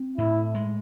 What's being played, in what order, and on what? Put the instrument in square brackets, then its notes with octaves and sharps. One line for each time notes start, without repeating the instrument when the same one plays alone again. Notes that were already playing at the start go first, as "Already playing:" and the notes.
Already playing: [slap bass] C4
[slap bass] A2 [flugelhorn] E4
[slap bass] G#3